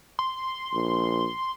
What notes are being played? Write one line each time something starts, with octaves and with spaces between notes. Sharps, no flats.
C6
A#1